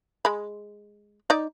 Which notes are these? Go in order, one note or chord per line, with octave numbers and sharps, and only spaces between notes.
G#3 B5
D#4 D5